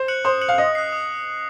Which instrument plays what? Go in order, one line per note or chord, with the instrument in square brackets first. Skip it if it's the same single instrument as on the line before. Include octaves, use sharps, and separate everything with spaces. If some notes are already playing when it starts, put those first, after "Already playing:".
Already playing: [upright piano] C5
[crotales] F#6 C#7 F#7
[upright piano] C5 [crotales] D#6
[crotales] F#6 C#7 F#7
[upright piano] F5
[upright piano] D#5 [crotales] D#6
[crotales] F#6 C7
D#6